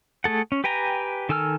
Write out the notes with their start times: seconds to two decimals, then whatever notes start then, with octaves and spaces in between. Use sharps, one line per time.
0.24 A3 G#4 A4 F#5
0.52 C#4
0.64 G4 B4 G5 G#5 A#5
1.29 D#3 A4 G#5 E6 F6